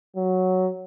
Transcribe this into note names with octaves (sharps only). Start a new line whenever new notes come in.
F#3